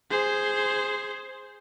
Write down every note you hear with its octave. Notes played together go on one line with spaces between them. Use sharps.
G#4 C5